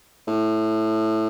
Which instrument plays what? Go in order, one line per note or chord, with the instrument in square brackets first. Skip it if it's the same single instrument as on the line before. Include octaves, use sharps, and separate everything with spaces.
[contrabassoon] A2